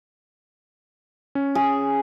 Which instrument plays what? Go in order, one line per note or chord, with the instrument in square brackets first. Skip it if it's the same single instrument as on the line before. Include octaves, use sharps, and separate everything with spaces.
[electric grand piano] C#4
[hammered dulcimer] G#4